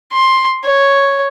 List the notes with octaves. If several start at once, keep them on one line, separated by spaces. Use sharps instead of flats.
C6
C#5